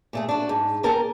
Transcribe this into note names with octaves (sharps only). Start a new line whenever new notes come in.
A#2 A3 G#4
D4 F#4
G#2
A#3 G#4 A#4 G5 A5